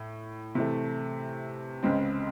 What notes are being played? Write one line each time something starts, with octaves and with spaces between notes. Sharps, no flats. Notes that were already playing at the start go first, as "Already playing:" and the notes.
Already playing: A2
C3 E3 A3
C#2 C#3 G#3 C4